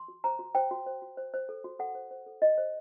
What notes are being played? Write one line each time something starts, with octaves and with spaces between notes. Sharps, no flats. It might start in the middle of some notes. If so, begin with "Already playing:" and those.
Already playing: C6
F#4
C5 A#5
F#4
C5 G5
F#4
C5
F#4
C5
C5
A4
F#4
A4 F#5
C5
C5
A4
F#4 D#5
C5